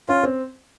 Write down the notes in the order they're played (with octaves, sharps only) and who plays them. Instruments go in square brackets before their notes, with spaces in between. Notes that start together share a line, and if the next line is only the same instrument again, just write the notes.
[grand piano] C#4 [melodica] F4
[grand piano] C4